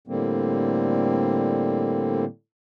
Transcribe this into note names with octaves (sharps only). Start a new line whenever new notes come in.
A2 D3 G3 A#3 C4